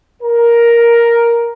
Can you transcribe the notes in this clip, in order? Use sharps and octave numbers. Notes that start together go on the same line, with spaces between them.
A#4